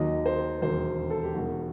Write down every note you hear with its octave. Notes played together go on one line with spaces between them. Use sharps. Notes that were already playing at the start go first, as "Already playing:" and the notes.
Already playing: D#2 D#3 F#3 D#5
C5
E1 D#2 D#3 F#3 C5
A4
G4
E1 E2 D#3 F#4